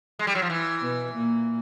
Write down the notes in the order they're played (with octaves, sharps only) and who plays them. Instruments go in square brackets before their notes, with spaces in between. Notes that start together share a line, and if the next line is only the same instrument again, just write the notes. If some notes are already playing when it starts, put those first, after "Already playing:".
[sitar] G#3
G3
F#3
F3
E3
[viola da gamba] B2 B3
A#2 A#3